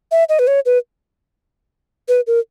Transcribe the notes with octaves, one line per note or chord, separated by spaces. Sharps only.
E5
D#5
B4
C#5
B4
B4
A#4